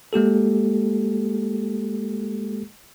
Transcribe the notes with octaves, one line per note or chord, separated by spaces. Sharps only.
G#3 A#3 G4 A4